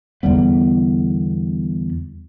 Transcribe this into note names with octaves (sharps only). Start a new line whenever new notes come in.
E2 D3 G3 B3